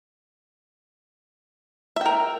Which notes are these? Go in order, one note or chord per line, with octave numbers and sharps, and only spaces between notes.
A#4 E5 G5